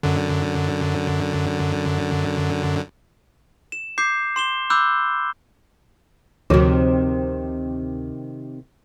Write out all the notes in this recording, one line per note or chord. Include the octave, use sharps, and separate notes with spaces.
F#2 D3
E7
D6 G6 C7
C6 E7 G7
B5 D6 E6 F#6 G6
D2 C3 D#3 F3 F#4